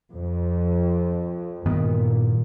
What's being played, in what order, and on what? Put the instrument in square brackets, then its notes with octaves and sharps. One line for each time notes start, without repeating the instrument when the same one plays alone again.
[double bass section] F2
[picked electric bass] G2 D#3 B3 [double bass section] A#2